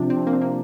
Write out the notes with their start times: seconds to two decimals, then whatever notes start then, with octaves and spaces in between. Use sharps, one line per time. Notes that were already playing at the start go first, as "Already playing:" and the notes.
Already playing: C3 F3 C4 D4
0.10 C4
0.27 A#3
0.33 C4
0.42 A#3